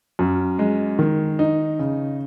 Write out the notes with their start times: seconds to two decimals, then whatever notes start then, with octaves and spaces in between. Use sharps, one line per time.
0.19 F#2
0.59 G#3
0.99 D#3
1.39 D#4
1.79 C#3